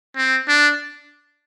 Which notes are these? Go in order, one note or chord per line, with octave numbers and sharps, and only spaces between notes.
C4
D4